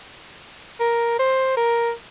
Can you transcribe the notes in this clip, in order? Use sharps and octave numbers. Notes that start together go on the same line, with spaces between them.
A#4
C5
A#4